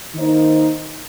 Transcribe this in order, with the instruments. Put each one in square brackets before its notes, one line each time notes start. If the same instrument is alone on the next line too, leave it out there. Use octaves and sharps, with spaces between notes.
[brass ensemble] D#3 A#3 D#4 C5